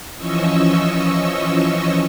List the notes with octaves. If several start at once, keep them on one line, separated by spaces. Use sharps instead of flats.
E3 F3 C#4 D#5 C#6 E6